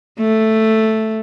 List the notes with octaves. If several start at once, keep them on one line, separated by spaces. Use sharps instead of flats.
A3